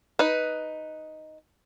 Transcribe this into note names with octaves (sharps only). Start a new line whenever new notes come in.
D#4 B4